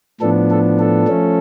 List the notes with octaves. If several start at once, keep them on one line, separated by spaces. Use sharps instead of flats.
A2 F3 B3 D4 A4
A4
A4
F3 A3 C#4